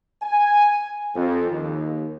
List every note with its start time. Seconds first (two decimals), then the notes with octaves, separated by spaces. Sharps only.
0.22 G#5
1.15 F2
1.50 D#2